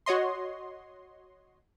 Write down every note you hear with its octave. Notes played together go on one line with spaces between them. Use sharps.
F#4 C#5 D#5 C6